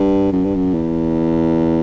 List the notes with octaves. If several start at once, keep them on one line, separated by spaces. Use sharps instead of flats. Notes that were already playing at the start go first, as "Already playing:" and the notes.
Already playing: G2
F#2
G2
F#2
E2